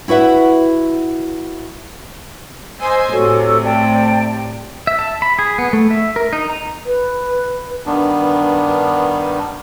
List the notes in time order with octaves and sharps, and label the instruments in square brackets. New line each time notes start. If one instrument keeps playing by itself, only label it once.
[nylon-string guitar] E4 F#4 B4 E5 F#5
[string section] C5 D#5 G#5 [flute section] E6
[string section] A2 C3 [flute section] F#4 A4 C#5
[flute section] D5 G5 A5
[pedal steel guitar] E5
A5
B5
G#4
B3
A3
E5
A#4
D#4
A#5
[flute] B4
[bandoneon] G2 D#3 B3 D4